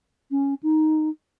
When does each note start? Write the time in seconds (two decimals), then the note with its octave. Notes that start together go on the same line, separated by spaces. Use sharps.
0.31 C#4
0.63 D#4